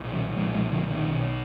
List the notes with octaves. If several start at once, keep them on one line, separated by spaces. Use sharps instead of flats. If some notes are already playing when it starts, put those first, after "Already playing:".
Already playing: B1 A#2
D#3 F#3
B1 A#2 F3 G#3
F3 G#3
D3 F3
D#3
B1 B2